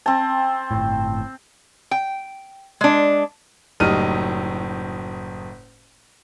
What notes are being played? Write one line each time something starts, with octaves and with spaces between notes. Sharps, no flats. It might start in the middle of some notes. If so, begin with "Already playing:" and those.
C4 A5
G1 A2
G5
G#3 D4
F#1 A2 G3 D#4 F6 D#7